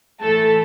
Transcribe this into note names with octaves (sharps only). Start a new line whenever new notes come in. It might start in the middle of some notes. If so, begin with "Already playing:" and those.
A2 E3 A3 A4 A5